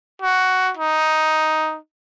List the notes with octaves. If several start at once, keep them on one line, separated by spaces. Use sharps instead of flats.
F#4
D#4